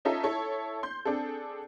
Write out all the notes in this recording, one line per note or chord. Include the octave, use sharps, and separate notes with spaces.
C#4 D#4 F4 A4 E5
E4 A4 C#5
C6 G6
C4 D4 G#4 A4